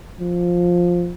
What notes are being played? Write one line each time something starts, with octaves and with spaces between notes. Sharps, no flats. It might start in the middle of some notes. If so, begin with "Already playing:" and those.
F3